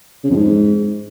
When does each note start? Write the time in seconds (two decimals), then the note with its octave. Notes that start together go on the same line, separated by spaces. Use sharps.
0.24 C#3
0.30 F2
0.37 G#2